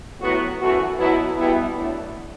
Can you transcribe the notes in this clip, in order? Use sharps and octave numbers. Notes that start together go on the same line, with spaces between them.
A2 F#3 B3 F#4
F#2 E3 A3 F#4
B2 F#3 B3 E4
B2 G3 B3 E4
A2 F#3 A3 D4